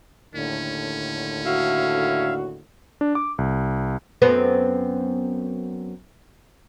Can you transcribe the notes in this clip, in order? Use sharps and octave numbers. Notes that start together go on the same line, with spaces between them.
D#2 A2 D3 C#4
F#4 E5 F5
D4
D6
C2
F#2 B3 C4